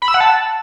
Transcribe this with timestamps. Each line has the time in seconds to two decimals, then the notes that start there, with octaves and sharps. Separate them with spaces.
0.02 B5
0.08 E6
0.14 F#5
0.20 A5